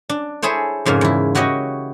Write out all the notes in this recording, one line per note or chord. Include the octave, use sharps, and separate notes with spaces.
D4
E4 G#4 A4 C5 C#5
F2 G#2 C#3 A#3
E2 E4
E4 F#4 G4 C#5 D#5